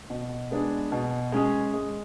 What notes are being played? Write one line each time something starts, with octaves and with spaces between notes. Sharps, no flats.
B2
G#3 B3 D4 G#4
B2
G#3 C#4 G#4
G#3